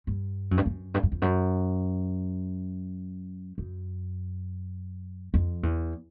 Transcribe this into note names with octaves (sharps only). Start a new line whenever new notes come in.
G2
F#2
G2
F#2
G2
F#2
F2
F#2
F#2
F2
E2